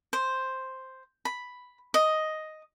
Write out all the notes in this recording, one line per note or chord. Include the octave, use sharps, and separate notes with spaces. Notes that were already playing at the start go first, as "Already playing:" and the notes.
C5
B5
D#5